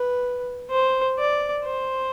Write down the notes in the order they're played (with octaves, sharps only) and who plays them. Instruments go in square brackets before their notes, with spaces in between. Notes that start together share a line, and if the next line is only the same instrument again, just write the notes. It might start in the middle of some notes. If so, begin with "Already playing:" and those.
Already playing: [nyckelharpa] B4
C5
D5
C5